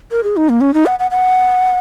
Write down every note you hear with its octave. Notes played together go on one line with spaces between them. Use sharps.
A#4
G#4
D#4
A#3
C#4
D#4
F#5
F#5
F#5